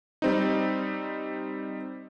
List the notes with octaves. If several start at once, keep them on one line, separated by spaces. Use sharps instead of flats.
G3 C4 D#4